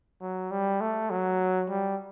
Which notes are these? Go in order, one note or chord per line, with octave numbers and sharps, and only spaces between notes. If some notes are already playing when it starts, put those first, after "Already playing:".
F#3
G3
A3
F#3
G3